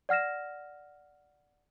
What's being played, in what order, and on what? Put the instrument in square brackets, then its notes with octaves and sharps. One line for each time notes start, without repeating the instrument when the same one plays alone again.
[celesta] D5 F#5 F6 A#6 E7